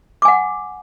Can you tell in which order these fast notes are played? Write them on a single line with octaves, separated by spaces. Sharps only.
D6 G#5 F#5